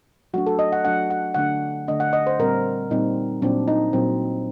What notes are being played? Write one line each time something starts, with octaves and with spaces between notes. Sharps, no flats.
F#3 A3 D4 F#4
A4
D#5
F#5
F#3 A3 D4 F#5
F#5
D3 A3 D4 F#5
D3 A3 D4 D#5
F#5
D#5
C5
A#2 G3 C4 A#4
A#2 G3 C4 D#4
A#2 F#3 C4 D4
D#4
A#2 F#3 C4